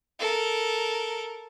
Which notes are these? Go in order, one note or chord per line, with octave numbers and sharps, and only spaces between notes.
A4 A#4